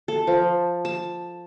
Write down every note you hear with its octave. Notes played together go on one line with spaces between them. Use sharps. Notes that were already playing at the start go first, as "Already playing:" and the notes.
A4
F3
A5